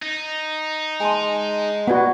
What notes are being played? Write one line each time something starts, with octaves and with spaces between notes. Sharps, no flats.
D#4
G#3 G#5 A5 C6
B3 F#4 D5 F#5